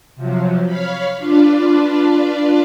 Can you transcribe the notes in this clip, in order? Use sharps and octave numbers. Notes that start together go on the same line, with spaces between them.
C3 F3 F#3
C#5 F5 B5
D4 F4 B4 D5